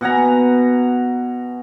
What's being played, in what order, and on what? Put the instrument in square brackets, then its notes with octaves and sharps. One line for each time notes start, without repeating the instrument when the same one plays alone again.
[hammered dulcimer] B2 F#5 G#5 A#5